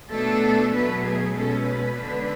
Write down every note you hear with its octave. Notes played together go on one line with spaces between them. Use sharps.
B2 A3 D4 A4
B2 F#3 A3 B4
G#4
B2 G#3 C#4 A4
B4
D3 G#3 D4